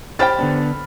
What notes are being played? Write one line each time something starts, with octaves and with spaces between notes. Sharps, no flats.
G4 C5 G5 B5 F6 A6
D3 B3 D4